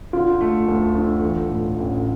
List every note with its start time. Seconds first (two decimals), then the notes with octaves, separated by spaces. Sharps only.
0.13 D3 F4
0.41 A3
0.68 D2 A4
0.95 D3 A4
1.22 E3
1.49 A2
1.76 A1